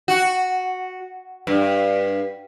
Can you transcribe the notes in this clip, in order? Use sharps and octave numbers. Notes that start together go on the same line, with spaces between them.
F#4
G2